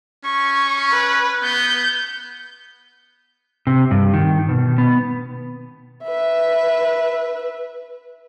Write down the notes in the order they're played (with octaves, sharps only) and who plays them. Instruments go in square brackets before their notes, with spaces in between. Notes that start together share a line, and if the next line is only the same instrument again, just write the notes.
[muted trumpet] C#4 [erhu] C#6
[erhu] B4
[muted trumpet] B3 [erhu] G6
[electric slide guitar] C3
G2
D#3
B2
B3
[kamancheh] B4 E5